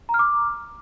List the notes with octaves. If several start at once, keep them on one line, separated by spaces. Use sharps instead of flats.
A#5
F6
D6